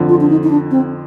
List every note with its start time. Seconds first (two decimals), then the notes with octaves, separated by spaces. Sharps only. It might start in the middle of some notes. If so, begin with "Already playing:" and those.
Already playing: F2 D3 F3
0.09 F4
0.20 D4
0.29 D#4
0.43 D#4
0.50 D4
0.71 C4